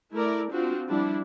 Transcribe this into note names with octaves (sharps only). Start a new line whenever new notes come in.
A3 E4 A#4 D5
C4 D4 F4 F#4
F3 G3 D4 E4